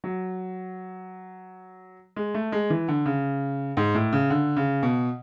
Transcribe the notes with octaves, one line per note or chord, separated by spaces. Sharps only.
F#3
G#3
A3
G#3
E3
D3
C#3
G#2
A2
C#3
D3
C#3
B2